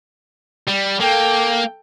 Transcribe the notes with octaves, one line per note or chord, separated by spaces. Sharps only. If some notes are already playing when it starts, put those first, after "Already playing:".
G3
A#3 A4 G5